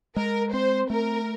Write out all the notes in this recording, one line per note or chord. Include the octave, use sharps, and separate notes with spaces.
G#3 A#4
C4 C5
A3 A#4